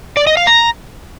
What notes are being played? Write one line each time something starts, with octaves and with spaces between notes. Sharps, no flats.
D5
D#5
F5
A#5